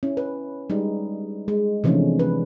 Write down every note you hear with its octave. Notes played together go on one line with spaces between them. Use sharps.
C#4 E4
B4
G3 G#3 D#4
G#3
C3 E3 F3 A3 C#4 D4
B4